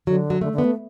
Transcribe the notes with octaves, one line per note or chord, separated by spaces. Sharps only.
D3 F#3
F#3
D3 A3
D3
B3
A3